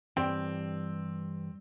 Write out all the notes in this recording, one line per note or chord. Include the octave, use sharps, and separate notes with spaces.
G2 E3 C4 G4 G5